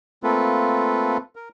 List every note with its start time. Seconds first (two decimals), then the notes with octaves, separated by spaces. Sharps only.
0.23 A3 A#3 C4 F4 A4 B4
1.36 A#4